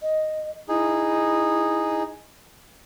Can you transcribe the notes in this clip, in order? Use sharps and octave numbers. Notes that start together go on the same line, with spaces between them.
D#5
D#4 E4 G#4